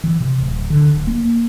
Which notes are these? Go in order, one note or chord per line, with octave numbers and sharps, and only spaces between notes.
E3
C3
D1
D3
D1
A#3